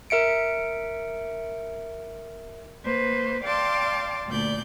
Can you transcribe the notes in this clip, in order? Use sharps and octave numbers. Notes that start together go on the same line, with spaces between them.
A#4 E5 C#7 D7
A#3 B4 C5
D5 F5 G5 A5 C6 D6
D2 A#2 D5 G6